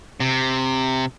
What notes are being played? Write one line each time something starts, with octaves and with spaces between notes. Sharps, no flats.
C3